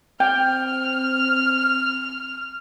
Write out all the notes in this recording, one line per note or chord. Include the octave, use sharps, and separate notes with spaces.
C4 G5 F6